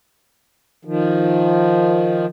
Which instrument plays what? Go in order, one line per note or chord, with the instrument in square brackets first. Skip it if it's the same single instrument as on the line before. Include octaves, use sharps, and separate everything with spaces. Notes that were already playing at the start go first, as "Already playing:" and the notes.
[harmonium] D#3 F3